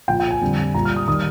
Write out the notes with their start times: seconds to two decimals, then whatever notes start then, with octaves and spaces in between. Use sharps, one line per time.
0.08 A#2 F3 G5
0.20 G5
0.31 G#5
0.41 F2 D3 G3
0.74 A#2 G3 A#5
0.85 F6
0.97 D#6
1.08 D#3 G3 D#6